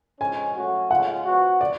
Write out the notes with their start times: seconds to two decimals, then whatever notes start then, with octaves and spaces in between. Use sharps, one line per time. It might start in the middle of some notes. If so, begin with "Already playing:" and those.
0.20 F3 G#3 C#4 G#5
0.55 F#3 A3 C#4 F#4
0.91 C#3 G#3 C#4 F4 F#5
1.25 F3 B3 F#4
1.61 D5